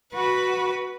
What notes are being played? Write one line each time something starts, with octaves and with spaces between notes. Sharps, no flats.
F#4 B4